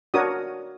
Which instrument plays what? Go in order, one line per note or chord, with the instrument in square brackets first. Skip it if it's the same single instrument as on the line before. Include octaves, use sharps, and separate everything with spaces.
[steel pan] D4 F#4 A#4 C#5 D#6